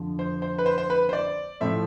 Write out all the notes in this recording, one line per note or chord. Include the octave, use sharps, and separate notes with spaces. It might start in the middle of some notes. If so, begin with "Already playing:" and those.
Already playing: F2 D3 F3
C5
C5
B4
C5
C5
B4
C5
D5
A2 F3 A3 C4 E5